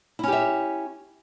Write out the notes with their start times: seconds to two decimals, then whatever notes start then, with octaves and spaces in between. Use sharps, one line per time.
0.19 E4
0.23 C#4
0.28 G4
0.33 E5